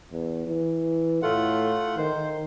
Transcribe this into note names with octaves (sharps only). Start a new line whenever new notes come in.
E2
E3
A2 A3 F4 F#5
D#3 C5